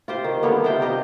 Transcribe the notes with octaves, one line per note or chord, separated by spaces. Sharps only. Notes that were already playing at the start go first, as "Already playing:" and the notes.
F4 G4 C5
D#3
D3 G3 A#3 B3
C3 F4 C5 G5
G3 D#4 G4 D#5